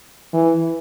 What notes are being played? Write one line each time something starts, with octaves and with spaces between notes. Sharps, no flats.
E3